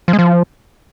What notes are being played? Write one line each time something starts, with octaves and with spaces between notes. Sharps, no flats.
F3
G#3
F3